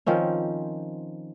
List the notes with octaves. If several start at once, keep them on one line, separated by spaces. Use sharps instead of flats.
D#3 F3 C4 C#4